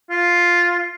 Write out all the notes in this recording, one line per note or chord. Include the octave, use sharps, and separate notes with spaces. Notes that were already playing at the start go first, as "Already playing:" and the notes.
F4